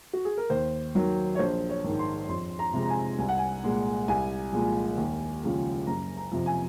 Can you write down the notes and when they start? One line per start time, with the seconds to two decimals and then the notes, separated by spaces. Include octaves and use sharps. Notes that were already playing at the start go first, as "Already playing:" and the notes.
0.13 F#4
0.25 G#4
0.37 A#4
0.50 D#2 C5
0.95 D#3 F#3
1.35 C#5
1.39 A#1 C5
1.69 C#5
1.84 G#2 D#3
1.99 C6
2.29 F2 C6
2.59 A#5
2.73 C3 F3 G#3
2.82 A#5
2.89 G#5
3.18 C2 G#5
3.29 F#5
3.38 G#5
3.64 A#2 G#3
4.08 C2 G#5
4.53 A#2 F3 G#3
4.97 D#2
5.42 C#3 F3 G#3
5.87 F#1 A#5
6.17 A#5
6.31 F2 C3 F3
6.46 G#5